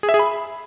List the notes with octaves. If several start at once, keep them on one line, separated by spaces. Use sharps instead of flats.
G#4
E5
G#4
B5